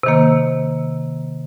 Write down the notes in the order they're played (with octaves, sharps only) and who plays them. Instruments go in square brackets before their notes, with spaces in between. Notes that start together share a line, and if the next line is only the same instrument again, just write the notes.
[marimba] C3 D#3 A#3